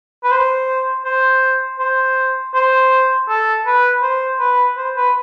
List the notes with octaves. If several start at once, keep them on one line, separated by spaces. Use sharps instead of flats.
B4
C5
C5
C5
C5
A4
B4
C5
B4
C5
B4